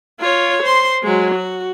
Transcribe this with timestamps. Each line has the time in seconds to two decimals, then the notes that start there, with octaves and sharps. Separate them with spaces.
0.20 F4 C#5
0.63 C5 C6
1.03 F#3 G#3
1.35 F#4